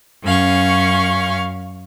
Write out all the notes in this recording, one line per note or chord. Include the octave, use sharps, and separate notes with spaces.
F#2 C#4 F5 C#6